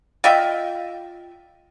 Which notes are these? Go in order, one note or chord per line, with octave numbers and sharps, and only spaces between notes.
F4 D#5 E5 G5